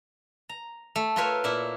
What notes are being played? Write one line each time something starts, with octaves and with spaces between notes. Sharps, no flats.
A#5
A3
F4 A#4 B4 C#5 E5 F5
A#2 E4 E5